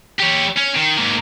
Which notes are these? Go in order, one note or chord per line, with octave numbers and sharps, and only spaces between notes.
G4 C#5
C#4
D#3
G#2 A#3